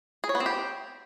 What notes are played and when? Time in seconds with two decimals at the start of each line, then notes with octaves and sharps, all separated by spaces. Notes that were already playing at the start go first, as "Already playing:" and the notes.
0.24 G#4
0.29 C#5
0.35 B3
0.40 C4
0.46 G4